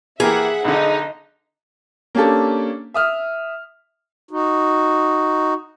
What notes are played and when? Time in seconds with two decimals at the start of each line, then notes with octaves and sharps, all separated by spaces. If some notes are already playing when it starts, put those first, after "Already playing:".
0.20 E3 A#3 G4 G#4 E5 F#5
0.65 B1 D3 D#4
2.15 A#3 C#4 D4 G4 A4
2.94 E5 D#6 F6
4.31 D#4 F#4